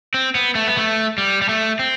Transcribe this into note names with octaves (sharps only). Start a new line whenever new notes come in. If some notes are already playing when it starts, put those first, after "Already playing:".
C4
B3
A3
B3
A3
G3
G3
A3
C4